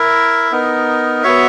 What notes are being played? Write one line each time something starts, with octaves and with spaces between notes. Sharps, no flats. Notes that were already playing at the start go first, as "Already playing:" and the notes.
Already playing: E4 A#4 E5
B3 D#4 A#4
B3 F#4 C#5 E5